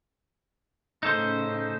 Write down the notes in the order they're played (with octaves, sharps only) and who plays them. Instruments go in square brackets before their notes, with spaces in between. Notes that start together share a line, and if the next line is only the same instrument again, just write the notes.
[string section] A2 C#3 [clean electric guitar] D#4 A4 C5